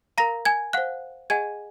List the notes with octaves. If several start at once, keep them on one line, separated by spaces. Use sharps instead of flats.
A#4 F5 A#5 A#6
G#5 G#6
C5 F5 F#5 F#6
G#4 D#5 F#5 G#5 G#6